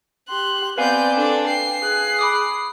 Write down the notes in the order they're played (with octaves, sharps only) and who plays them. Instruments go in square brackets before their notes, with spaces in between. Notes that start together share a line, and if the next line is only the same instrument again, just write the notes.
[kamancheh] G4 C6 [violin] F#6
[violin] B3 G6 [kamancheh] C4 D5 [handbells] B4 F5 G#5
[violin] D4 A4
[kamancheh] G5 [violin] C7
[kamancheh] G#4 F#6
[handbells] B5 D6 D#6